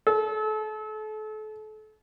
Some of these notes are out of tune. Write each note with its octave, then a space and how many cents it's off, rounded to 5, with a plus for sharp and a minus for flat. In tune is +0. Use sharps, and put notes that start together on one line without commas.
A4 -35